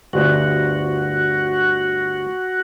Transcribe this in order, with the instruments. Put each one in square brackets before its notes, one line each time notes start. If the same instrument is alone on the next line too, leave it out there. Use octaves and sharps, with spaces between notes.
[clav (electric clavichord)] G1 D2 [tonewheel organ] F#4